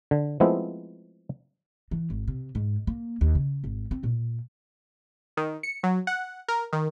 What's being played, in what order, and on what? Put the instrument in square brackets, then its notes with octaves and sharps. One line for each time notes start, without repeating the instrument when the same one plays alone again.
[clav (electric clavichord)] D3
F3 G#3 A3 B3 C4 E4
[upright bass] E3
G#1
C3
G#2
A#3
D#2
C#3
G#1
C4
A#2
[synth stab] D#3
C#7
F#3
F#5
A#4
D#3